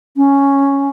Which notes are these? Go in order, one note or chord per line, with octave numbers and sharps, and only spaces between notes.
C#4